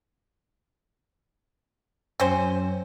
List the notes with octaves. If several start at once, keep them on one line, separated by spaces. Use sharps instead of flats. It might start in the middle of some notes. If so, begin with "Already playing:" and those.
F#2 C4 C#4 C5